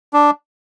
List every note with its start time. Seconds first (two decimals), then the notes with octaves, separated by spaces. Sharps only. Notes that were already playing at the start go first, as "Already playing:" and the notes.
0.13 D4